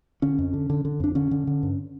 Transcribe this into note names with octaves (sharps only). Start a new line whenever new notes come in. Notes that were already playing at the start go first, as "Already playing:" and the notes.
D3 C#4
F2
D3
D3
D3
F2 D4
D3 C#4
D3
D3
G2